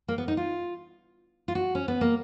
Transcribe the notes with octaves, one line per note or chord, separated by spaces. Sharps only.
A#3
B3
D#4
F4
F4
F#4
C#4
B3
A#3